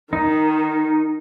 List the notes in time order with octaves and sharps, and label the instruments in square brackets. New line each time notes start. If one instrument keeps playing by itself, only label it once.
[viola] D#3 [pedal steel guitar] D#4